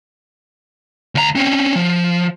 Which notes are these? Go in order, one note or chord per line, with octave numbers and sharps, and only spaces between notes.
D2 A#5
C4 C#4
F3